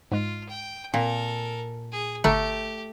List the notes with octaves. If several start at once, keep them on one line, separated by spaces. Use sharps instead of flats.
G#2 G#3 F4
G5
A#2 C4 A4 A#4
G#4
G1 D3 A3 G4 A#5